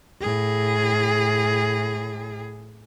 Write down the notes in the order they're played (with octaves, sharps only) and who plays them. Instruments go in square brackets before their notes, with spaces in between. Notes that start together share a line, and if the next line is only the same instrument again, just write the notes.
[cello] A2 G#4